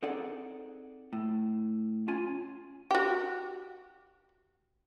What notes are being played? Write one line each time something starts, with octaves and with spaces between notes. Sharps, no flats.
C4 D#4 G#4 A4 D5 F#5
A2
C#4 F4 G#5
F#4 G4